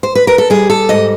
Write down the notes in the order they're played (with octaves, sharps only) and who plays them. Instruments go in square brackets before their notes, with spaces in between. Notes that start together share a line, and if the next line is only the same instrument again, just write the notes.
[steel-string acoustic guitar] C5
B4
A#4
A4
G3 G#4
A4
G#2 D#5